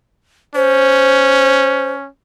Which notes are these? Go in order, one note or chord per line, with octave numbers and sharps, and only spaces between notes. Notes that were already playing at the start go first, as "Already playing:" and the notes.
C#4 C5